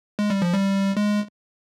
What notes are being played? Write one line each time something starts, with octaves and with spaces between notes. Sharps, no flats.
G#3
G3
F3
G3
G#3